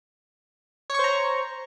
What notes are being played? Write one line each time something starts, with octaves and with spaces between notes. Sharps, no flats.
C5 C#5 A#5 C#6